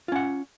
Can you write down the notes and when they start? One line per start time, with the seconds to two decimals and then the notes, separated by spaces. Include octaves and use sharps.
0.08 F4
0.12 C#4
0.16 F#5